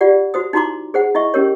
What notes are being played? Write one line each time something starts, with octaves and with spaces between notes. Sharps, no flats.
F4 G4 D5 F#5
F#4 C5 D#6
D#4 E4 F#4 A#5 C6 D6
G#4 C5 F#5
E4 D#5 E5 C#6
C#4 G4 A#4 C#5